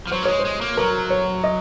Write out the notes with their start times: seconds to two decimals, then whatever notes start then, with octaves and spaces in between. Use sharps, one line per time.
0.07 F3
0.12 F#3 C5
0.23 A#3
0.25 G#3 C#5
0.39 C5
0.45 G#3
0.61 A#3
0.77 F#3 A#4
1.11 C#5
1.44 D#5